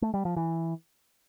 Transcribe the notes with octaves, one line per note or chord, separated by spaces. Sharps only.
A3
G3
F3
E3